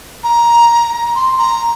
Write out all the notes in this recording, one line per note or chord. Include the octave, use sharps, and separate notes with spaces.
A#5
C6
A#5